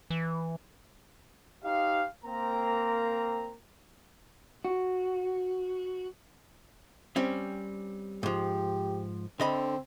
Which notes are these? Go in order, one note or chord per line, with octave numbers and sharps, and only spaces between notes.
E3
D#4 G4 C5 F5
A#3 C4 A#5
F#4
G3 C4 C#4
G#2 F3 G4
D3 C4 D#5 B5